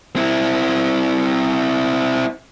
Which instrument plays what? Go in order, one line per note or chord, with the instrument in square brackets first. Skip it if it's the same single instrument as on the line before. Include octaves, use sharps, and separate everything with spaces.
[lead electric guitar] C4 E4